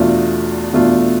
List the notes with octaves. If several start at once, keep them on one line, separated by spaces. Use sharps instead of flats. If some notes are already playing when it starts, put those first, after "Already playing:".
Already playing: E2 B2 A3 D4 F4
E2 B2 A3 D4 F4